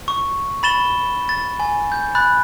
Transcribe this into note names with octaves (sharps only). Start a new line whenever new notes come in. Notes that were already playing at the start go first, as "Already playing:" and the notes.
C#6
B5 A6 E7 G7
A6
G#5
G6
B5 F#6 A6